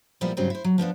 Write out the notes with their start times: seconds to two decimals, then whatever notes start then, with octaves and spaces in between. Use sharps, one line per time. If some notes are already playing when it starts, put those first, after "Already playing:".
0.21 A#2 F3 G3 B3 E4
0.37 G2 C#3 F#3 G3 C4 D#4
0.50 E4 C5
0.64 F#3
0.78 F3 B3 D4 F4